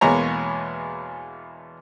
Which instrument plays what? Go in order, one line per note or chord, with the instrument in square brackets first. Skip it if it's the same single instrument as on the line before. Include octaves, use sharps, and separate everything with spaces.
[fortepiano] E2 B2 G#3 A#3 C#5 A#5